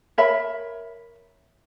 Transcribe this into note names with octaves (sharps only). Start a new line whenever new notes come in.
A#4 C#5 E5 B5